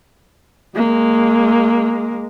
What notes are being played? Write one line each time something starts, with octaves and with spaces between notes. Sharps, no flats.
G#3 A#3